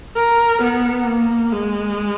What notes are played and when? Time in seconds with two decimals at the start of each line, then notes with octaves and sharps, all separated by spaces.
0.16 A#4
0.62 B3
1.07 A#3
1.53 G#3